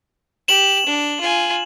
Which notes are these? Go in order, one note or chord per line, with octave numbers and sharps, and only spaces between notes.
G4 E7 F#7
D4
F4 G#5